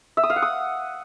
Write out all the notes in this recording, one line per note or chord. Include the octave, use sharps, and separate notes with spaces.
E5
D#6
F5
F#5
D#6